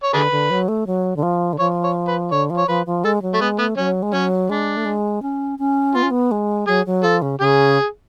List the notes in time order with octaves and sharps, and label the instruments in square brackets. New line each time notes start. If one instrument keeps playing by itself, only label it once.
[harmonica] C#5
[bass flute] D3 [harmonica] D4 G#4 B4
[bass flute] D3
F#3
A3
F#3
D3
F3
D3
[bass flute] F3 [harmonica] C#5
[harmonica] C#5
B4
[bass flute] D3 [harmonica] C#5
[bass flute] F3
[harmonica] C#5
[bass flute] F3 [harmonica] B4
[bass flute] F3
[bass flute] G#3 [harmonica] A4
[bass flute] F#3
[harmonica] A3
[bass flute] G#3 [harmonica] B3
[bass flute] A3 [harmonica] B3
[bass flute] F#3 [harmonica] C#4
[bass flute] G#3
[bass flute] F#3 [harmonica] C#4
[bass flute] G#3 [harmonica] D4
[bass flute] A3
G#3
C#4
C#4
[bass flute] B3 [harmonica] F4
[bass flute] C#4
B3
G#3
[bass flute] F#3 [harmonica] G#4
[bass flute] F#3
[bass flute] F3 [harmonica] A4
[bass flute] C#3
[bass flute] C#3 [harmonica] G#4